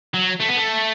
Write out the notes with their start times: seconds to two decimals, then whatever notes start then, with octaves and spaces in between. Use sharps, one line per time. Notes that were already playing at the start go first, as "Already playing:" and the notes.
0.14 F#3
0.41 A3
0.49 B3
0.57 A3